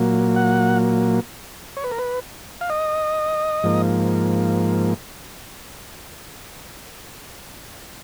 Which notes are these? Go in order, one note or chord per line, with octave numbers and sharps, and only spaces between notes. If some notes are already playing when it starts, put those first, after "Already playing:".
Already playing: A#2 F#3 A#3
F#5
C#5
B4
A#4
B4
F5
D#5
G#2 F3 A#3